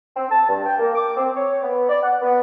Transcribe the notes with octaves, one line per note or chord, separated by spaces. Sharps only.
C4
A5
G2
G5
A#3
D6
C4
C#5
B3
D5
F#5
B3